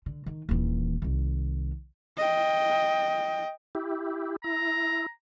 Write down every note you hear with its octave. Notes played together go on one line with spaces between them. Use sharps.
D3
D#3
D#1 E3
C2 D#3
D#5 G5
E4 G4
E4 A#5